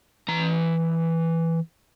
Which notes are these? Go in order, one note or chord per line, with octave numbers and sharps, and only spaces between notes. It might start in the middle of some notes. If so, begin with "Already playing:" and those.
E3 A#5